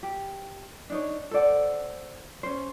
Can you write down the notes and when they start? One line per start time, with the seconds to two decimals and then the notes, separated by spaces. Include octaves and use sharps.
0.03 G4
0.90 D4 D#4 C#5
1.31 A4 C5 D5 F#5
2.43 C#4 C5